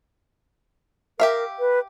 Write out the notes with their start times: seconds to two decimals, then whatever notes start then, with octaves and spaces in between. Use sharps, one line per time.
1.20 G4 A#4 E5 F5
1.59 B4